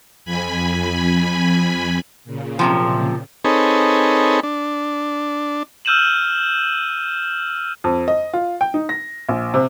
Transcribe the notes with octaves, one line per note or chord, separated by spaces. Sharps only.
F2 G#5 B5
A#2 C#3
F#2 C3 F3
C4 D#4 G#4 A4 B4 C#5
D4
E6 F6 G6 D#7 E7 F#7
F2
D#5
F4
G5
D#4
A#6
A#1
C3